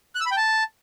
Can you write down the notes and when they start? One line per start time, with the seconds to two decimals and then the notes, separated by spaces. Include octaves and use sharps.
0.15 F#6
0.21 E6
0.26 B5
0.31 G5
0.37 A5